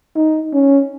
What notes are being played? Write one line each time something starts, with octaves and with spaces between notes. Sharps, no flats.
D#4
C#4